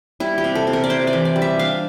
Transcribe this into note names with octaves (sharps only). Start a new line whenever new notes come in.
G3 E4
G4
C3
A4
C3
A#4
D5
E4 C5
D5
E3
D5
G3
E5
D4 F5